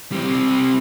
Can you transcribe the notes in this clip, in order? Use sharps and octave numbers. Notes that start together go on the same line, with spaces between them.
G3 C4